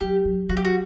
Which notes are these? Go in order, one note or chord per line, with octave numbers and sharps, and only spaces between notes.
F#3 G4
F#3
F#3 F#4
G4
F#4